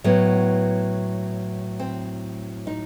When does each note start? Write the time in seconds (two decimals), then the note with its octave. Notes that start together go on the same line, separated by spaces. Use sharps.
0.04 A2 F#3 B3
1.79 C4
2.67 D#4